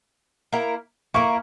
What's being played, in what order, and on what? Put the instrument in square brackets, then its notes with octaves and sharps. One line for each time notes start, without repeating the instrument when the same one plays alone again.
[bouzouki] A#3 E4 A#4
[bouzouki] A#3 E4 A#4 [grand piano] C#6